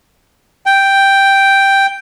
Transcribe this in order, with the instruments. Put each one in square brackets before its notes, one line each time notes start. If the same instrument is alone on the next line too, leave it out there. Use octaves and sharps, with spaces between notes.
[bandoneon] G5